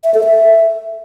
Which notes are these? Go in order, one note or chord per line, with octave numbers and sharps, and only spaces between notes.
E5
A4
E5